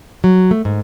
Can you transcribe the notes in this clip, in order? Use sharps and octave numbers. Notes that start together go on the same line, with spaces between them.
F#3
A3
G#2